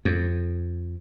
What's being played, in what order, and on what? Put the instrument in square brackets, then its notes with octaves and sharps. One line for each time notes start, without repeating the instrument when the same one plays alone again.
[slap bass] F2